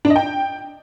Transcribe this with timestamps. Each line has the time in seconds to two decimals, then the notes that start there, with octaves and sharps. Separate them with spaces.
0.05 D4
0.10 D#5
0.16 G5